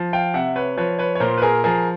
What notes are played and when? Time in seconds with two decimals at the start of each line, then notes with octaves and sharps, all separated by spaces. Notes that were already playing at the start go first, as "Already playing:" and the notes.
Already playing: F3
0.13 F5 G5
0.34 C3 E5 F#5
0.56 B4 C#5
0.77 F3 B4 C#5
0.99 B4 C#5
1.15 C#5
1.20 A#2 A#4 C5
1.38 B4
1.42 G#4 A#4
1.64 F3 G#4 A#4